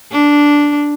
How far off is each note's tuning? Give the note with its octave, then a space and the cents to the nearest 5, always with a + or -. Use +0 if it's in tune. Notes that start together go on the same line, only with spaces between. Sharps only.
D4 -5